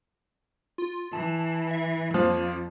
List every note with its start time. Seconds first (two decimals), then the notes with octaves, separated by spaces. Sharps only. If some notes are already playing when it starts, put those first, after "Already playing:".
0.78 F4
1.13 E3 A5
1.71 E5
2.14 F2 F3 A#3